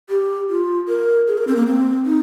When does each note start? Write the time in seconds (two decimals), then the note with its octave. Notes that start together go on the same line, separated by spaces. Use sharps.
0.09 G4
0.49 F4
0.88 A#4
1.28 G#4
1.38 A#4
1.48 C4
1.56 A#3
1.67 C4
2.06 D#4